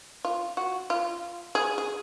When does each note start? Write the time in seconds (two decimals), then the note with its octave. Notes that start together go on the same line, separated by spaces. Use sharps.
0.25 F4
0.57 F#4
0.90 F4
1.55 G#4
1.78 G#4